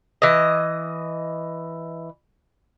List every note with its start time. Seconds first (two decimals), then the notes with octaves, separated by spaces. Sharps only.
0.22 E3 D#5